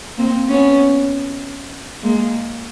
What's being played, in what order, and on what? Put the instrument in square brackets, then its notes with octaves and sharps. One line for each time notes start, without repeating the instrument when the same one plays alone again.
[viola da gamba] A#3 C4
B3 C#4
G#3 A#3